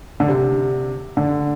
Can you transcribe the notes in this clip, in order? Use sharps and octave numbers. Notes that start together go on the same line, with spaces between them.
D3
C3
D3